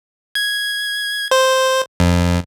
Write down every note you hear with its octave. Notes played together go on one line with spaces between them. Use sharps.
G#6
C5
F2